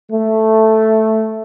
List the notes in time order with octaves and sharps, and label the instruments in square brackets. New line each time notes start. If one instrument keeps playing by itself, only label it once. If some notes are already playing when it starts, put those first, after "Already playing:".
[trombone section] A3